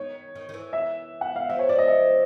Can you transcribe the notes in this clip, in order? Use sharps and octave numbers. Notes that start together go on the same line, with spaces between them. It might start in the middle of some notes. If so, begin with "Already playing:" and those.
Already playing: D#3 C#5
D#3
D#3
E3
E5
F#5
F5
F3 E5
C#5
F3 D5
D#5
E5